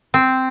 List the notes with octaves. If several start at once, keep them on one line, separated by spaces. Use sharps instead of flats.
C4